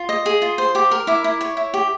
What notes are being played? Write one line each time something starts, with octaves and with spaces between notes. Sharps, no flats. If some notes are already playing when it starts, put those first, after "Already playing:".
Already playing: F4
D#5
G#4
F4
C5
G4 D6
A#4
E4 D6
E4
C#5
E4
G4